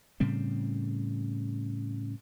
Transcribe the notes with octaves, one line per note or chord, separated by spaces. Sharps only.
A2 C#3 G3 C4